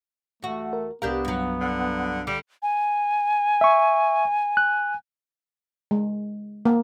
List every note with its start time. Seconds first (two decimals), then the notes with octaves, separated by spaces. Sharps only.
0.42 E2 A3 F#4
0.73 A#4
1.02 C2 B3 D4 G4 A#4 F5
1.25 G2 F#3
1.61 D3
2.27 D3 G3
2.63 G#5
3.61 E5 C#6
4.57 F#6
5.91 G#3
6.65 A#3